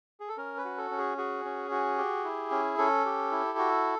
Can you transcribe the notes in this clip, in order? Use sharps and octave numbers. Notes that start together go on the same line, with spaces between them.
G#4
A4
C#4 A#4
B4
F#4
A4
C#4
G#4
F#4 G#4
C#4
F#4
G4
E4
C#4
C#4 A4
G4
E4
F#4